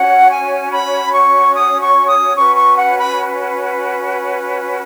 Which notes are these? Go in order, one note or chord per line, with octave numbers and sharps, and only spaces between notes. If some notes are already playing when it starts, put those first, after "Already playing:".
Already playing: C#4 F#4 C#5 F#5
G#5
B5
C#6
D#6
C#6
D#6
C#4 F#4 B4 C#6
C#6
F#5
B5